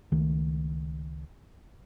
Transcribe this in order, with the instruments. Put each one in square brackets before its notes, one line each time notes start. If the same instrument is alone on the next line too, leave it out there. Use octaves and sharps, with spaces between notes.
[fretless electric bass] C#2 D#3 A3